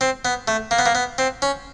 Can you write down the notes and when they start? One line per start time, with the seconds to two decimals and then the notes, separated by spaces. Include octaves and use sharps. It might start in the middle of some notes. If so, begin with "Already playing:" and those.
0.01 C4
0.25 B3
0.48 A3
0.71 A#3
0.79 B3
0.86 A#3
0.95 B3
1.18 C4
1.42 C#4